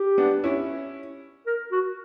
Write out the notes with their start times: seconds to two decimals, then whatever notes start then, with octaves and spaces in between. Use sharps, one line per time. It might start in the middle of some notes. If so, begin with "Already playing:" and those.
Already playing: G4
0.18 B3 D4
0.44 C#4 E4
1.47 A#4
1.72 F#4